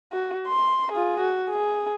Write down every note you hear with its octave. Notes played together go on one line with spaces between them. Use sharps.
F#4
C6
F4 G#4
F#4
G#4